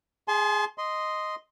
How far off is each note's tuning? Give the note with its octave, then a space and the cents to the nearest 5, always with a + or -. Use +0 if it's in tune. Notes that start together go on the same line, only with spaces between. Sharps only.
G#4 -5 A5 -45 C6 +0
D#5 +0 C6 -10